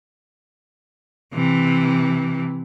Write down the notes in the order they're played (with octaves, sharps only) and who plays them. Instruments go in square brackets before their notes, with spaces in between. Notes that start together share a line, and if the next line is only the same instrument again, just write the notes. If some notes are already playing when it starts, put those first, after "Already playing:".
[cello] C3 E3